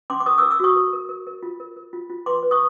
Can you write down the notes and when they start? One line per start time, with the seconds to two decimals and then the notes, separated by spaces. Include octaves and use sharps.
0.10 C#4 C6 D6
0.20 D6
0.26 A#4 C#6 D#6
0.38 A#4 D6 E6
0.50 D6 E6
0.60 F#4 C#6 D#6
0.75 A#4
0.93 A#4
1.09 A#4
1.27 A#4
1.43 F4
1.60 A#4
1.76 A#4
1.93 F4
2.10 F4
2.26 B4 C6 D6
2.43 B4
2.51 C#6 D#6